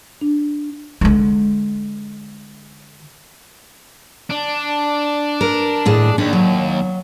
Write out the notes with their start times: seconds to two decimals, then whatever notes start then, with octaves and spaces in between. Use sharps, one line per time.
0.21 D4
1.01 D3 G#3
4.30 D4
5.41 A#4
5.85 D#2 A2 G#4
6.18 D#2 D4
6.33 F#3